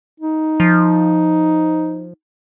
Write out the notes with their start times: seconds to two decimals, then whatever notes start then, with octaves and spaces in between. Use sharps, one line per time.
0.20 D#4
0.60 F3